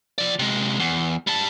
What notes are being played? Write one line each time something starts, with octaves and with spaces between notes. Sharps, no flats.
F3 D5
C3 G#3
E2
G3 A5